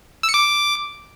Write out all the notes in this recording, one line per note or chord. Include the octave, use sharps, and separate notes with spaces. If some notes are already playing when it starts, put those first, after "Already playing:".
E6
C#7
D6